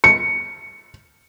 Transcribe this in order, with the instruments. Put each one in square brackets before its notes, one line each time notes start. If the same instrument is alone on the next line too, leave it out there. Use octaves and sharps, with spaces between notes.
[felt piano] C#7